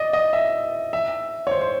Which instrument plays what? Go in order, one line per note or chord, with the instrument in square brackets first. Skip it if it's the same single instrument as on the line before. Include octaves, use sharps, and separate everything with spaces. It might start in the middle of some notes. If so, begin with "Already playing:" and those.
Already playing: [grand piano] D5 D#5
D#5
E5
E5
C#5
C5
C5